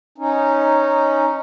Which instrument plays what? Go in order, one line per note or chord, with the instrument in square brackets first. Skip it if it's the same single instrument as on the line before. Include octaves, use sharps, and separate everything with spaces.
[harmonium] C#4 D#4